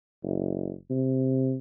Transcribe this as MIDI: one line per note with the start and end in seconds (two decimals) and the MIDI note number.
0.23 0.73 30
0.91 1.56 48